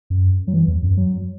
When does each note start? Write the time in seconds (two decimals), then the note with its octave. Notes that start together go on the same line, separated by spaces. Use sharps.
0.10 F#2
0.47 F#3
0.54 E3
0.68 E2
0.83 F#2
0.97 F#3